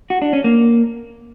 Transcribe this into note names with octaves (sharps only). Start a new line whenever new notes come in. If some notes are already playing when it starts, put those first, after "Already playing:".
F#4
D4
C#4
A#3